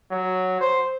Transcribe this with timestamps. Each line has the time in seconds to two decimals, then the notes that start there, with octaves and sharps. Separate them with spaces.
0.11 F#3
0.61 C5